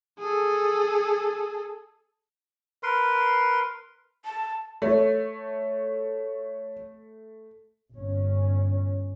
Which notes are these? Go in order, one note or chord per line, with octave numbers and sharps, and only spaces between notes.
G#4 A4
A#4 B4 C6
A5
A3 C#5
G1 C#4